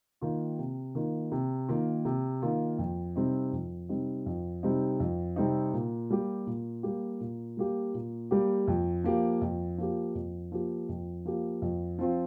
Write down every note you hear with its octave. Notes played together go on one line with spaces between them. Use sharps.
D#3 A#3 F4
C3
D#3 A#3 F4
C3
D#3 A#3 F4
C3
D#3 A#3 F4
F2
C3 G3 C4 D#4
F2
C3 G3 C4 D#4
F2
C3 G3 C4 D#4
F2
C3 G3 C4 D#4
A#2
G3 A#3 G4
A#2
G3 A#3 G4
A#2
G3 A#3 G4
A#2
G3 A#3 G4
F2
F3 A#3 G4
F2
F3 A#3 G4
F2
F3 A#3 G4
F2
F3 A#3 G4
F2
F3 C4 F4